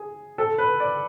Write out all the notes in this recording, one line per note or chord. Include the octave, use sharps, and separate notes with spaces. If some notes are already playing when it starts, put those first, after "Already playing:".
Already playing: G#4
A4
B4
D5